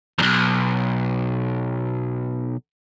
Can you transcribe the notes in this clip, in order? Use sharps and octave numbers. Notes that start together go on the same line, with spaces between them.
B1 E2